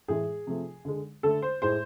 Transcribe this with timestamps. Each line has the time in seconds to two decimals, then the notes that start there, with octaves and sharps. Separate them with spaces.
0.08 A2 E3 G#3 G#4
0.47 C3 F3 A3
0.85 D3 G#3
1.23 D3 A3 A4
1.42 C5
1.62 A2 G#3 C5